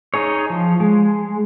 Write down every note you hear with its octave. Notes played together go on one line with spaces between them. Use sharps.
D#4 G#4 C#5
F3
G#3